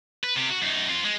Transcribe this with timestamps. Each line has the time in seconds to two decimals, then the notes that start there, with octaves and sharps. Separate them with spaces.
0.24 B4
0.36 C3 G4
0.50 F#4
0.62 F#2 D#4
0.89 C4 F4
1.05 G#3